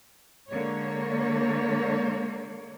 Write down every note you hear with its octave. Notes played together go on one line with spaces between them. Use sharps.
D3 G#3 A#3 C#5